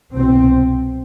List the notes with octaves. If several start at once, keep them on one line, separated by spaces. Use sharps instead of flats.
C2 B2 C4